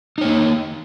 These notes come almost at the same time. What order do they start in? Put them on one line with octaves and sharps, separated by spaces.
D#4 C#5 A#3